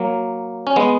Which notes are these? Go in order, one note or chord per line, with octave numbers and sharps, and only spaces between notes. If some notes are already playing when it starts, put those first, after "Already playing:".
Already playing: F#3 A#3
C#4
G#3 B3